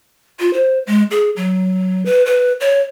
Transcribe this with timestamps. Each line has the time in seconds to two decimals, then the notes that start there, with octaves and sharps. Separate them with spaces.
0.39 F4
0.53 C5
0.87 G#3
1.11 G#4
1.36 F#3
2.05 B4
2.26 B4
2.61 C#5